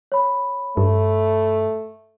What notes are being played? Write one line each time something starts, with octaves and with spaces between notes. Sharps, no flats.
C#5 B5
G2 A3